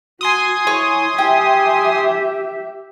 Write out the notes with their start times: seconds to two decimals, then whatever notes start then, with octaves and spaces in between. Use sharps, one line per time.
0.21 F#4 G#5 C6 D#6
0.67 E4 C#5 C#6
1.18 G4 E5 G5